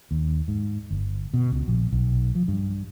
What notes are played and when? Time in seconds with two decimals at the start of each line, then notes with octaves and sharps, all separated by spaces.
0.11 D#2
0.48 G#2
0.91 G1
1.34 B2
1.51 C#2
1.68 A#1
1.92 B1
2.35 F3
2.48 G2